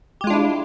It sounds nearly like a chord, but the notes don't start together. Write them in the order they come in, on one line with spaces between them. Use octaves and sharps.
G4 G#3 F4 D4 E4